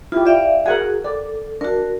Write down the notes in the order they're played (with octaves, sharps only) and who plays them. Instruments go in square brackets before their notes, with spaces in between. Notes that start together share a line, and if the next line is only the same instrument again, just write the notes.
[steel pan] E4 G4 [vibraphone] F4
[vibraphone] D5 E5 F5 [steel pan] G5
[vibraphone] F#4 G#4 [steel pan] A#4 F#5 G#5
[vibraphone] A4 [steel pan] D5
[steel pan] D4 [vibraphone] F#4 A#4